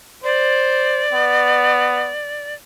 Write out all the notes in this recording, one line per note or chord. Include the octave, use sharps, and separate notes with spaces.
C5 D5
B3